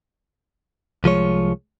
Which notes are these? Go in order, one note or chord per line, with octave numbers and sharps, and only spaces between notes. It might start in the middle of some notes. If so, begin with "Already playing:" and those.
C2 F3 G#3 C#5